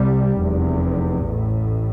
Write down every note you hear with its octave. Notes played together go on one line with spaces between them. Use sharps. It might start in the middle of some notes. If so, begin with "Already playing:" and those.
Already playing: C2 C3 G3
F1 E2 C3
A1 A2